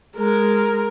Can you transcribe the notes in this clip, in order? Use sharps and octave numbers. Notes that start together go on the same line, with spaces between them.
G#3 A#4